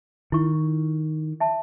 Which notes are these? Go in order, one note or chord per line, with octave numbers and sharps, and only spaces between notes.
D#3 E4 C#6
E5 A5